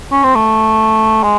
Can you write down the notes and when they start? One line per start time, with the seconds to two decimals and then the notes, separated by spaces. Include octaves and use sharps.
0.12 C#4
0.24 C4
0.35 A3
1.23 G#3